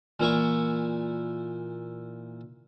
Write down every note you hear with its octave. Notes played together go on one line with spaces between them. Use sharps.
A#2 E3 E4 C#6